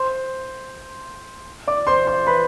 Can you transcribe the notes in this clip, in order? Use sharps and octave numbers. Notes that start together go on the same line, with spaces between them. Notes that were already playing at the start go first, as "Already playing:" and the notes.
Already playing: C5 C6
D5 D6
C5 C6
C5 C6
B4 B5